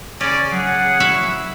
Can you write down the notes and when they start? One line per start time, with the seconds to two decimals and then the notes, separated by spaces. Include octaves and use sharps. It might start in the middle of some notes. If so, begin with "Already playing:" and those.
0.21 C#3 C#4 D5
0.52 F#3 G#4 F#5
1.00 E4 F#4 E5 F5